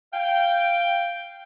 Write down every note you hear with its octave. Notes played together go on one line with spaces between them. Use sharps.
F5 G5